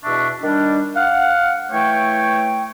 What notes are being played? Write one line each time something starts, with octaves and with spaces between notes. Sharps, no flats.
E2 B2 D4 E5 C#6
D#3 G3 D4
F5 F#5
E3 A3 C#5 G5